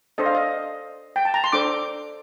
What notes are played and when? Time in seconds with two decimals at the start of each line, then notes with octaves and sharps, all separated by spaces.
0.18 D4 A4 C5 D#5
0.26 F5
0.35 D#5
1.16 G5
1.25 A5
1.34 A#5
1.44 C6
1.52 D4 A4 C5 D6